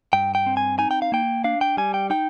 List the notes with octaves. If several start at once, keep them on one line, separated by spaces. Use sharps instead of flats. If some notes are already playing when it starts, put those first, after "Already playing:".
G2 G5
G5
C4
G#5
D#4 G#5
G5
F5
A#3 G5
D4 F5
G5
G3 G#5
G5
D#4 G5